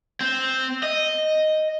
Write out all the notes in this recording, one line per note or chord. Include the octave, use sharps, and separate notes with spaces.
C4
D#5